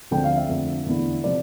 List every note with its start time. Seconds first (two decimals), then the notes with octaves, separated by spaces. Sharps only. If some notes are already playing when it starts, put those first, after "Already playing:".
0.11 D2 D3 F3 A3 C4 G5
0.24 F5
0.37 E5
0.49 F2 D3 A3 D4
0.86 E2 D3 A3 E4
1.24 C3 F3 D5